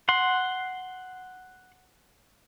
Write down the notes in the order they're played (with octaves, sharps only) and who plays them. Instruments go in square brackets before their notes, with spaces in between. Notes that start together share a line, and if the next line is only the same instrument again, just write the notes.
[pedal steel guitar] F#5 C6